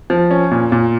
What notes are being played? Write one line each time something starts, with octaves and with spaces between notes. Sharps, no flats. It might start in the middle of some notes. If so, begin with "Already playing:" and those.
F3
C#4
A#2
A#2